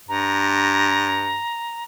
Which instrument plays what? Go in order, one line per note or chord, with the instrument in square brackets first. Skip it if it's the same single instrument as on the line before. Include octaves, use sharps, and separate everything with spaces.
[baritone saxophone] G2 [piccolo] A#5